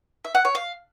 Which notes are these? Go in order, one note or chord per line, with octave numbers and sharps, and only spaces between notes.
E5
F#5
C#5
F5